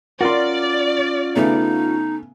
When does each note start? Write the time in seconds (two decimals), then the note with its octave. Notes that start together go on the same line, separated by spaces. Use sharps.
0.21 C#4 F4 F#4 A#4 D5 C6
1.36 C#3 A3 B3 D#4